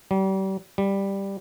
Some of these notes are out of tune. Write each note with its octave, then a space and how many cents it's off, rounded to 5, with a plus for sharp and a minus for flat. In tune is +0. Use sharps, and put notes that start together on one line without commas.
G3 -35
G3 +5